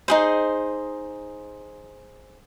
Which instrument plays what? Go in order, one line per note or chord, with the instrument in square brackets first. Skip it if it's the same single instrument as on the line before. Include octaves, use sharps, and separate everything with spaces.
[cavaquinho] D#4 G#4 C5